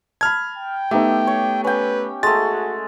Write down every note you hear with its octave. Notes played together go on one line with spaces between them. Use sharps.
A5 B5 F6 G#6
G5
A3 B3 D#4 G4 E5
C#5
C#4 B4 G5
G#3 A3 F#4 A6